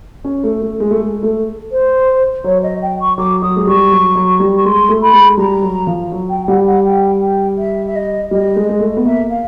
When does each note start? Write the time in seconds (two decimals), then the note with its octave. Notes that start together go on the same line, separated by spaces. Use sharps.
0.24 C#4
0.44 A3
0.62 A3
0.80 G#3
0.91 A3
0.98 G#3
1.23 A3
1.71 C5
2.44 F#3 C#5
2.62 D#5
2.82 G5
3.00 C#6
3.18 F#3 D6
3.42 F#3 D#6
3.56 G#3
3.67 G3 C#6
3.92 F#3
4.16 F#3
4.40 G3
4.56 C#6
4.65 G#3 C6
4.89 A3
5.02 B5
5.13 G#3
5.37 G3 A#5
5.62 F#3
5.87 F3
6.12 F#3
6.29 G5
6.47 G3 F#5
6.66 F#5
6.85 G5
7.21 G5
7.58 E5
7.86 E5
7.95 D#5
8.31 G3 D#5
8.56 G#3
8.69 G#3
8.80 A3
8.97 B3
9.05 A#3 E5
9.29 F5